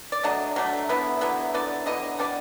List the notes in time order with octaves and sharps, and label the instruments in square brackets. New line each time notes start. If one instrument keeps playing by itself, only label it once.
[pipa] D5
F#3 A3 D4 D#5
F#3 A3 D4
D3 F#3 B3 E4
D3 F#3 B3 E4
D3 F#3 B3 E4 D5
D3 F#3 B3 E4 D#5
G3 B3 D4 D5